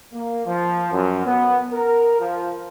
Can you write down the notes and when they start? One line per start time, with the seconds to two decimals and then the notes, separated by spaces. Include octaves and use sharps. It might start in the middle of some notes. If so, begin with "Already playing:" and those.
0.12 A#3
0.46 F3
0.92 F#2
1.26 B3
1.72 A#4
2.19 F3